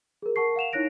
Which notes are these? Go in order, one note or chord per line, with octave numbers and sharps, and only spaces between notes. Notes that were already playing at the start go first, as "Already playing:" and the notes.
G#4 A#4
A#4 F#5 A5 C#6 C7
F5 F#5 E7 F7
D#4 E4 C#5 F#6 A#6 D7